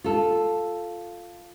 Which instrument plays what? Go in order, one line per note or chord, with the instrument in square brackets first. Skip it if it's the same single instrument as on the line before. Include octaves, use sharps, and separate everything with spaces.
[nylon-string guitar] F4 A4